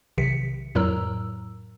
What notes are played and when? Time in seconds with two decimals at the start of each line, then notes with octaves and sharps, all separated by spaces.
0.18 B1 C3 D#3 B6 C#7
0.75 F2 A2 F#3 A#4 A#5 E6